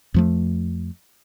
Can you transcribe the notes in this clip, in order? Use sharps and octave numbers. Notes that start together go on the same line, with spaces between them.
F2 F3 A3